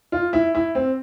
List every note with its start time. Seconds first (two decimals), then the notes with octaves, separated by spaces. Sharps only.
0.12 F4
0.33 E4
0.55 E4
0.75 C4